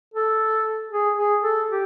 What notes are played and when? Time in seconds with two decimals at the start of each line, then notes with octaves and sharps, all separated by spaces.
0.14 A4
0.92 G#4
1.17 G#4
1.44 A4
1.69 G4